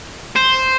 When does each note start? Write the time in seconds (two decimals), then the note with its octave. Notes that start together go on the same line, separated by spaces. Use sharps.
0.36 C5